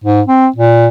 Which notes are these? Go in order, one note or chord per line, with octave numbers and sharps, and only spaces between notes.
G#2
C4
A#2